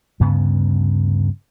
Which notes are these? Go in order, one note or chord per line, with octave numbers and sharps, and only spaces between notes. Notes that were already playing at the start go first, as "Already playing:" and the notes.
D2 G2 C#3 B3